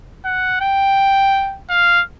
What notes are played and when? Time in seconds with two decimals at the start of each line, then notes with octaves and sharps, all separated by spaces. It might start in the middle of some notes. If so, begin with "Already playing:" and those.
0.25 F#5
0.61 G5
1.69 F5